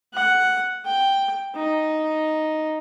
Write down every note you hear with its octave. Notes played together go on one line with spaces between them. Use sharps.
F#5
G5
D#4